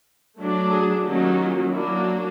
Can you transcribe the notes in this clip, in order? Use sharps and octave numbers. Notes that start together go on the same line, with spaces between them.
F#3 A3 D4
G#4
D#3 F#3 A#3 C#4 G4
F4
F#3 A#3 D4 E4